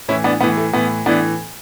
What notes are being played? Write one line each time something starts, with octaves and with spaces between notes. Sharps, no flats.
A2 E3 C#4 E4
B3 D4
A2 E3 B3
A3
A2 E3 B3
A2 E3 B3 D4